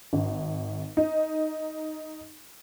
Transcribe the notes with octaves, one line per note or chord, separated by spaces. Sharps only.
G#1
D#4